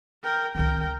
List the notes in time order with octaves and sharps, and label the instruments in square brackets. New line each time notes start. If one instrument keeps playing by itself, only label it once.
[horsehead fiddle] A#4 G5
[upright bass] C2 D#3 [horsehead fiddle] A#4 G5